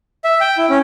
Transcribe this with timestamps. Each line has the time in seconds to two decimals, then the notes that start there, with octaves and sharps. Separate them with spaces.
0.24 E5
0.40 G5
0.57 E4
0.70 C#4